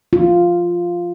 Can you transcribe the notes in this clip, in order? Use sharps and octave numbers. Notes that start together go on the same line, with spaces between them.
F4